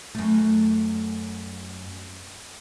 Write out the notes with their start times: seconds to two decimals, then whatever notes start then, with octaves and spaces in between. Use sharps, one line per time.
0.15 F#2 A3